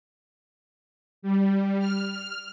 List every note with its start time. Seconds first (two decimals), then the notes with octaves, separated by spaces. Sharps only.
1.22 G3
1.79 F6